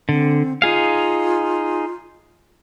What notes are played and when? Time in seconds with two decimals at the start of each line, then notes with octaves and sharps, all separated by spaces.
0.09 D3 C4
0.62 D#4 F4 G#4 F5